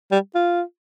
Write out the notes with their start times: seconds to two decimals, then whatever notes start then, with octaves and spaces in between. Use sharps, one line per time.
0.12 G3
0.35 F4